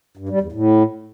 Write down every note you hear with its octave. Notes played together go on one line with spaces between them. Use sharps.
G2
G3
E2
A2